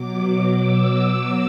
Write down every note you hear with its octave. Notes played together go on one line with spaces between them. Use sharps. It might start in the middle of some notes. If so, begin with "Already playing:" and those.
Already playing: B2 F#3 D6
E6